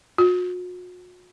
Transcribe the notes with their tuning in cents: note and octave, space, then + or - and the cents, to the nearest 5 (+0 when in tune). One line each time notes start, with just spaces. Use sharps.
F#4 -40